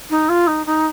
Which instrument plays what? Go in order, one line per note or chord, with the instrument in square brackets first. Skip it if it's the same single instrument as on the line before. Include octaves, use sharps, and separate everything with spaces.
[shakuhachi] D#4
F4
D#4
D#4